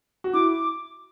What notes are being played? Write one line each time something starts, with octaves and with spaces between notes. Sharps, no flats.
F#4
E4 D6
D6